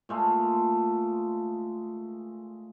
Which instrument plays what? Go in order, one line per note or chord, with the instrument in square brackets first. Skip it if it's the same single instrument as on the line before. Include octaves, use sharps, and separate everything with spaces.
[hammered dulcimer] A#2 G#3 A3